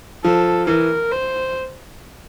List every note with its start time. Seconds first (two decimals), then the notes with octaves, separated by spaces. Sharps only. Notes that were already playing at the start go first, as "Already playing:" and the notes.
0.24 F3 A4
0.67 E3 A#4
1.11 C5